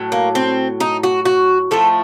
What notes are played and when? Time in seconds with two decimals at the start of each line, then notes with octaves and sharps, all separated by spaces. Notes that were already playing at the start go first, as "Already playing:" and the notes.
Already playing: A2 F#3
0.12 A#3
0.35 C4
0.80 D#4
1.03 F#4
1.25 F#4
1.71 A2 F3 A3 A4